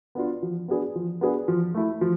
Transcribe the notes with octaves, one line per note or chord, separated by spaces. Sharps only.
B3 D4 F4
F3
B3 D4 G#4 B4
F3
B3 D4 G#4 B4
F3
A3 E4
F3